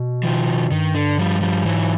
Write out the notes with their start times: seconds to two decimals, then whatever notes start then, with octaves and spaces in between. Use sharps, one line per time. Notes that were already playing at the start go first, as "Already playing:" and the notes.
Already playing: B2
0.24 D#3 F3
0.71 G2 D#3
0.95 D3
1.18 F3 G3
1.41 F3 G3
1.65 G#2 E3 F#3